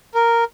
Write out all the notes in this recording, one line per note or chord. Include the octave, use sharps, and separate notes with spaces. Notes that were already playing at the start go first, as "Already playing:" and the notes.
A#4